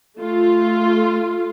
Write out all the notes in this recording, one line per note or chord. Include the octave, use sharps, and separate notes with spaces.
A3 F4